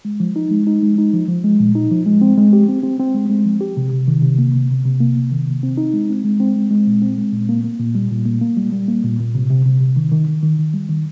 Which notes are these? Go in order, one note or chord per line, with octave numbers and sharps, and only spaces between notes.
G#3
F3
D#4
G#3
D#4
G#3
D#4
F3
F3
G#3
A#2
D#4
F3
G#3
C4
G#3
G4
C4
C4
C4
G#3
G#3
F3
G4
C3
C3
D#3
C3
A#3
C3
C3
C3
A#3
C3
D#3
C3
C4
D#4
G#3
C4
G#3
C4
G#3
G#3
A#2
C4
G#3
A#2
A#3
A#3
A#2
G3
A#2
A#3
A#3
G3
G3
A#3
A#2
A#2
C3
C3
C3
C3
D#3
D#3
D#3
D#3
D#3
G3
D#3